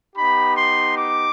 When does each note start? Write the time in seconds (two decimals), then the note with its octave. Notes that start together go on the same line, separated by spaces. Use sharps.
0.16 B3 D#4 G4 B5
0.56 C6
0.97 D6